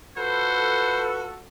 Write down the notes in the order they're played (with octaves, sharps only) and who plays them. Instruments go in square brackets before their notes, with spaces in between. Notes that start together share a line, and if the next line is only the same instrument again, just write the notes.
[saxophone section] F4 F#4 A4 [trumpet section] B4 [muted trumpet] C5